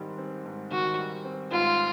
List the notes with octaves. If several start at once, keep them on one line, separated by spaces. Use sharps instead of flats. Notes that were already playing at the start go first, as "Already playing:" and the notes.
Already playing: G#2 D#3 G3 C4
C4
G#2
D#3 F#4
G3
C4
G#2 F4